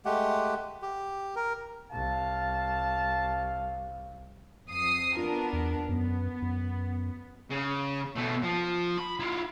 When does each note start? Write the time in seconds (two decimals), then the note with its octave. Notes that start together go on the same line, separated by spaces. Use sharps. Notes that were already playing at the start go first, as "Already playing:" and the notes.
0.05 G#3 A3 G4 F#5
0.82 G4
1.36 A#4
1.92 C2 F5 A5
4.69 F2 D#6 C7
5.17 B3 D4 F4 A#4
5.53 E2
5.89 F#2 B3
6.42 F#2
7.50 C#3
8.16 B2 A3
8.42 F3
8.98 B5
9.20 E4 F4